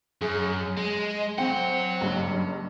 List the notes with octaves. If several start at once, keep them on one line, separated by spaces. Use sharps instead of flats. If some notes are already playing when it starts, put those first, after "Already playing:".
F#2 G#4
G#3
F#3 C4 C5 F#5 G5
F#1 G2